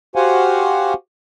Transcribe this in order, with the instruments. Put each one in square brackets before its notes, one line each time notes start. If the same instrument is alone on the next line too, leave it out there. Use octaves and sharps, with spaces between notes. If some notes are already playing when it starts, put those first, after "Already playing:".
[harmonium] F#4 G4 C5 F5 F#5 G#5